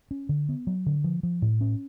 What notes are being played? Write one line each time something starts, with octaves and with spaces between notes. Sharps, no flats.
C#4
D3
B3
F#3
D3
F3
F3
A2
C#4